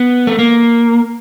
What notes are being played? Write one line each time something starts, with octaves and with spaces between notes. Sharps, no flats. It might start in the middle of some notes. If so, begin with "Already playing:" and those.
Already playing: B3
A3
A#3